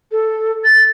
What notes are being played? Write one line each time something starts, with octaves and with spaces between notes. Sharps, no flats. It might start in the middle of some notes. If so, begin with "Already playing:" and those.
A4
A6